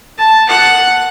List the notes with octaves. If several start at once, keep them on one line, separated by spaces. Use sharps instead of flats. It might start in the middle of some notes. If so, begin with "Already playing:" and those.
A5
F#5